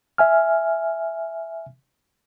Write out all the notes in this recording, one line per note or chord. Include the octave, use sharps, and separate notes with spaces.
E5 G#5 F6